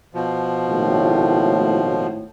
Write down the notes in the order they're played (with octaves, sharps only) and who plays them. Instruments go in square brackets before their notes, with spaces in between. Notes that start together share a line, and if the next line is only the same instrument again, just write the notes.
[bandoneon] B2 F3
[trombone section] G#1 A2